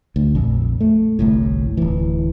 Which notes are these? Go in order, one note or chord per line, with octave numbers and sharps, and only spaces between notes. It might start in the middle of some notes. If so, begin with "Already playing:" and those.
D2
A#1 F2
A3
G1 C2 A2
D1 E3